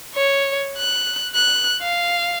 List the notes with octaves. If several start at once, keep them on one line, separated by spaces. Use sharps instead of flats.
C#5
F#6
F#6
F5